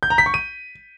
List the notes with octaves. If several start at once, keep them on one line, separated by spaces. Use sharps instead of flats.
G6
A#5
B6
C#6
D#7